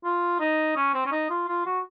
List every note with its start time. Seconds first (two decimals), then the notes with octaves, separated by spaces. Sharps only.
0.04 F4
0.40 D#4
0.76 C#4
0.94 C4
1.06 C#4
1.12 D#4
1.30 F4
1.48 F4
1.66 F#4